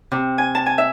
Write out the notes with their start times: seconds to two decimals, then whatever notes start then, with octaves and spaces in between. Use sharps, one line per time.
0.12 C3
0.38 G#5
0.55 A5
0.66 G#5
0.78 E5